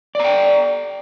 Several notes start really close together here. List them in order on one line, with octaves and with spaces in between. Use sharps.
D5 A#5 G5